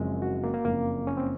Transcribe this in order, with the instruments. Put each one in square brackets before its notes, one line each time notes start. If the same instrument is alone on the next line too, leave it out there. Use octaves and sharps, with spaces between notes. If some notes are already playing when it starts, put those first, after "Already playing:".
Already playing: [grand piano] F#1 F#2 F3 G#3 C4
[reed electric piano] F#4
A#3
A#3
[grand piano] F#1 F2 C#3 [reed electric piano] A#3
[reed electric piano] C#4
C4